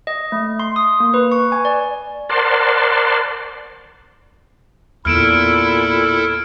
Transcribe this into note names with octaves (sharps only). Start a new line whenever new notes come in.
D#5
A3
C6
D#6
A#3
B4
C#6
G#5
D5
A#4 C5 D5 F#5 A5 C6
E2 A#2 E4 A4 F6 D7 E7